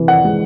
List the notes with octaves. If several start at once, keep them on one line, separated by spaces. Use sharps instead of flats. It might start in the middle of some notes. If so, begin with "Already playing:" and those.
Already playing: C3 E3
F#5
G#3